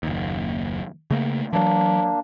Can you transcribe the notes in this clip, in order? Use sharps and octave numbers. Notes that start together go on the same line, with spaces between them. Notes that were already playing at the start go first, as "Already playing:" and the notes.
F#1 D#2
C#3 A3 A#3
E3 F#3 A#3 D4